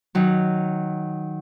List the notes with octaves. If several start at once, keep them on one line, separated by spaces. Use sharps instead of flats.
D#3 F#3